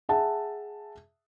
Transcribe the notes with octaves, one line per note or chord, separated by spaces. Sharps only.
G#4 E5 F#5 A5